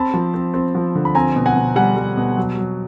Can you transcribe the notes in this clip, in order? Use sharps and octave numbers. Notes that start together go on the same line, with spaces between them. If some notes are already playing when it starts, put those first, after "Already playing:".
Already playing: C4 A5 B5
F3
C4
C4
F3
D3
B5
C4 G#5 A#5
B2
F#5 G#5
B2
G3 F#5 G#5
G3
B2
F#3
F#3